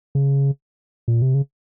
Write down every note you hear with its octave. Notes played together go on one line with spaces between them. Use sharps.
C#3
A#2
C3
C#3